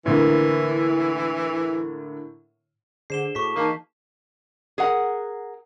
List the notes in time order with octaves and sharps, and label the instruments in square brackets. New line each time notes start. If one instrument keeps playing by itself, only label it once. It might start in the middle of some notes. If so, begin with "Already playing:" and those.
[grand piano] A2 D3 A#3 [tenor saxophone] E3
[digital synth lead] D3 [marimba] G#4 C5 [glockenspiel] C7 E7 G7
[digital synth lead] A2 [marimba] F#4 D6 [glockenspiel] C#6 B6
[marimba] E3 A5 [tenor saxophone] A#3 [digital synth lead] D#4
[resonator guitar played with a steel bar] G#4 A#4 F#5